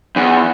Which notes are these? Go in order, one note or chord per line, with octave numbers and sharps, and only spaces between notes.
E2